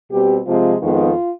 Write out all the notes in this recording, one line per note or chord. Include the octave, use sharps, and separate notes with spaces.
B2 G3 C4 G4
C3 F3 G#3 C4 F4
F2 D#3 G#3 B3 F4